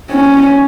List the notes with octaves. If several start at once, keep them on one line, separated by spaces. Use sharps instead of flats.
C#4